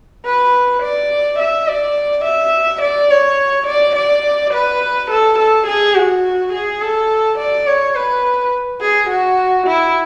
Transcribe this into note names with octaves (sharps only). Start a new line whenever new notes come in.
B4
D5
E5
D5
E5
D5
C#5
D5
D5
B4
A4
A4
G#4
F#4
G#4
A4
D5
C#5
B4
G#4
F#4
E4